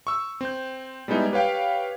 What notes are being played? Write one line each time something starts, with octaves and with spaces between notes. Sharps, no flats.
C#6 E6
C4 G6
G3 G#3 B3 D#4 E4
G4 B4 C#5 F5 G5